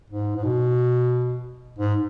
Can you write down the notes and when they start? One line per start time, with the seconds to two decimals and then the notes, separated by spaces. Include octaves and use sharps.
0.11 G#2
0.37 G#2
0.45 B2
1.79 G#2